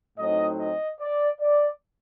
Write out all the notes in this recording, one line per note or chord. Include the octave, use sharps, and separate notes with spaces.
A2 F#3 C4 D#4 D#5
D#5
D5
D5